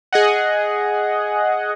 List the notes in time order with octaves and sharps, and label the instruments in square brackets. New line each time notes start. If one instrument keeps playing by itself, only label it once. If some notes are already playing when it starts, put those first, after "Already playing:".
[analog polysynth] G#4 D#5 F#5